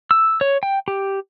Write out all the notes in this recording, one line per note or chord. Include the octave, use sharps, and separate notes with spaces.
E6
C#5
G5
G4